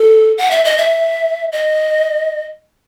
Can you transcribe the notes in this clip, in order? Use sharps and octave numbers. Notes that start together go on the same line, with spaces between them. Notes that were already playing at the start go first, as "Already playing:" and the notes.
Already playing: A4
F#5
E5
D#5
E5
D#5